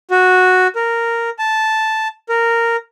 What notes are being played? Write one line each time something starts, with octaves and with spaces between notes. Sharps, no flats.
F#4
A#4
A5
A#4